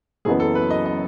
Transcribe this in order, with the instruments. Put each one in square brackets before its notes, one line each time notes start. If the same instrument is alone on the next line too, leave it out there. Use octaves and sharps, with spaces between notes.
[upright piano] F#1 F#2 E3 B3 [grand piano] G#4
[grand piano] A4
B4
D#5
D#5